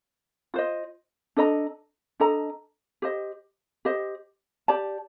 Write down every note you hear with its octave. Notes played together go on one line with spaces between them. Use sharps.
F4 C5 D#5
D4 A4 D#5 A#5
D4 A4 D#5 A#5
G4 C5 D#5
G4 C5 D#5
G4 D5 A5